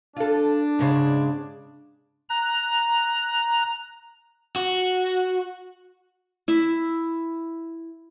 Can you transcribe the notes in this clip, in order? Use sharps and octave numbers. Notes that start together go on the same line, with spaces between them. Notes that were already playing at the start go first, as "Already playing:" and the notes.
D4 F4 A4
G#2 C#3 G#3
A#5 F#6
F#4
E4 E5